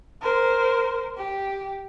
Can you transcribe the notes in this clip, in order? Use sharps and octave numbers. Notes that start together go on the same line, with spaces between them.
A#4 C5
G4